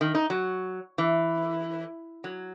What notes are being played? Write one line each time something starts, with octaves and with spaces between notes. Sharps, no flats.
D#3
D#4
F#3
E3
F#3